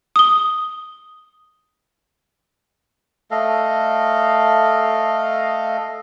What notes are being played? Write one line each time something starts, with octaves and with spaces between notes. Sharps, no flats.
D#6 G7
A3 A4 D#5 F5